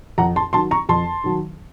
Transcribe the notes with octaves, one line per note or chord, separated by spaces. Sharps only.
F2 F#5 A#5
A5 C6
D#3 F#3 A5 C6
A#5 C#6
F2 A5 C6
D#3 F#3